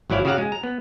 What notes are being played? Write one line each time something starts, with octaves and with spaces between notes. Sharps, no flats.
G#1 F#3 E4 D5 F5
C#3 F#4 G4 F5 F#5 A#5
G#3
A#5
B3